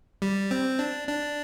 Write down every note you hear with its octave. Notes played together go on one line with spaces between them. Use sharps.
G3
C4
D4
D4